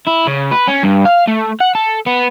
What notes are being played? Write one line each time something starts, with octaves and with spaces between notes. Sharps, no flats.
E4
C#3
B4
C#4
G2
F5
A3
F#5
A4
B3